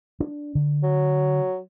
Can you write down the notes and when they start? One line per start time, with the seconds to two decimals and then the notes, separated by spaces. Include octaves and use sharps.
0.20 D4
0.55 D3
0.83 F#3